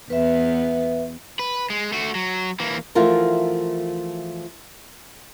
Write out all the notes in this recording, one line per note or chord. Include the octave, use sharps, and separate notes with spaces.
E2 B3 B4 E5
B4
G#3
A3 F#4
F#3
E3 A#3
E3 F3 A3 F4 F#4 A#4